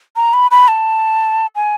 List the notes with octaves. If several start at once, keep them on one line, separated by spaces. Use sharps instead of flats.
A#5
B5
B5
A5
G#5